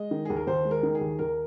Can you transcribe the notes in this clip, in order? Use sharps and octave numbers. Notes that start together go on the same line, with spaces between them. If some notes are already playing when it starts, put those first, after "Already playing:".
Already playing: G#3 D#5
D#3
D#2 G#4
A#4
D#2 C5
G#3
A#4
D#3
G#4
D#2
D#2 A#4